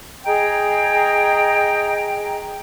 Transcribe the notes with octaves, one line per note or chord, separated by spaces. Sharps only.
G#4 D#5 G5 A#5